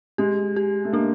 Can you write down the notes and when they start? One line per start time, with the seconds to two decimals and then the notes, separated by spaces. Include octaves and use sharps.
0.18 G#3 G4
0.56 G4
0.85 A3
0.93 A#3 D4